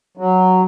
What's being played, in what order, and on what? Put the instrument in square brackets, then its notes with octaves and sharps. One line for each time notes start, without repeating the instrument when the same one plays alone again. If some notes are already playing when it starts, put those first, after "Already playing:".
[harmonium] F#3